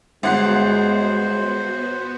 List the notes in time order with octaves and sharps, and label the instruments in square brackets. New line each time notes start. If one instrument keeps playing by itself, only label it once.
[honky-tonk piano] G1 F#5 C7 [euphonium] G#3 [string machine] B3 F#4 [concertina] C5